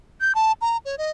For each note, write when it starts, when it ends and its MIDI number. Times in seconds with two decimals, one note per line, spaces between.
0.21 0.33 91
0.35 0.52 81
0.61 0.77 82
0.85 0.96 73
0.98 1.11 75